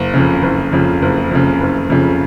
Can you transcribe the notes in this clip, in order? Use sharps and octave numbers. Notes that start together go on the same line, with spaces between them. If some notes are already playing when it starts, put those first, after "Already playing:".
Already playing: F#1
F2 C#3
F#1
F2 C#3
F#1
F2 C#3
F#1
F2 C#3